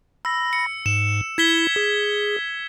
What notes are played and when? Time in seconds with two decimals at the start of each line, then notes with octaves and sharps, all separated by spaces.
0.25 B5 E6 A#6
0.53 C#7
0.86 G#2 E7
1.38 E4 G#6 B6 G7
1.76 G#4